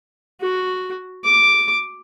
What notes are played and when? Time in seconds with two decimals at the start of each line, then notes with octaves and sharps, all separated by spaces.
0.41 F#4
1.24 D6